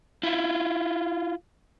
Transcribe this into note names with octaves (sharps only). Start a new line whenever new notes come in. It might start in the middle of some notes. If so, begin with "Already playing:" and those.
E4 F4